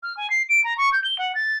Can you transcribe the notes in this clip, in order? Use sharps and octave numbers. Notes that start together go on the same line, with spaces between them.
F6
G#5
C7
D7
A#5
C#6
G6
G7
F#5
A6